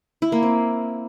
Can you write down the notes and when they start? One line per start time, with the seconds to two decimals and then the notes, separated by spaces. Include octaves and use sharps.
0.22 E4
0.32 A#3
0.42 C4